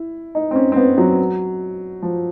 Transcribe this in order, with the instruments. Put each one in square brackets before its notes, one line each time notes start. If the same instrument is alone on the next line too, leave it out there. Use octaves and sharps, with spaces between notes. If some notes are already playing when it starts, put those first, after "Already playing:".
Already playing: [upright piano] E4
D#4
C4
C#4
C4
B3
F#3
F3